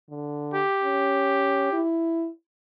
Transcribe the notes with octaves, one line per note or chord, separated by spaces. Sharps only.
D3
G4
C#4
E4